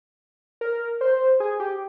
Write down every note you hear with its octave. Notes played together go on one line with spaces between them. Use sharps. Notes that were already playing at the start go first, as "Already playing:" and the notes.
A#4
C5
G#4
G4